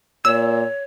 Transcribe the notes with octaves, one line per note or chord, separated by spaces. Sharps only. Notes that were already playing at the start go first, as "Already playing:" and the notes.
A#2 C#5 E6